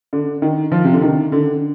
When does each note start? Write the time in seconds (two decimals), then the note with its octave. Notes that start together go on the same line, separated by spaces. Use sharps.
0.13 D3
0.42 D#3
0.72 F3
0.85 C3
0.93 D3
1.02 D#3
1.32 D3